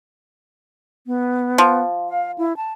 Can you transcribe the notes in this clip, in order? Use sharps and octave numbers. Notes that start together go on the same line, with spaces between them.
B3
F3
F5
E4
A5